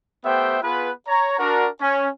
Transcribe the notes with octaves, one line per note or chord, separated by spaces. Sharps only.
A3 B3 G4 C5 E5 G5
B3 F4 G#4 B4
C#5 A#5
D4 F#4 A#4
C#4